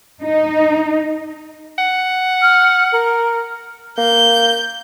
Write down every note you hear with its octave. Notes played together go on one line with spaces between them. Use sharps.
D#4
F#5
F6
A#4
A#3 G6